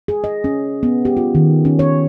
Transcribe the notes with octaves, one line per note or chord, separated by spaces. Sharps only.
G#4
D#5
C#4
B3
G4
F4
D#3
C#4
C#5